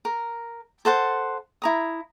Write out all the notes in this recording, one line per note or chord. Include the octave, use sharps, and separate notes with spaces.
A#4
A4 C5 F#5 A5
E4 A#5 D#6